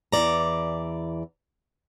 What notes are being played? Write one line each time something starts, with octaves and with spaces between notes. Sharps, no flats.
E2 E3 D5 A#5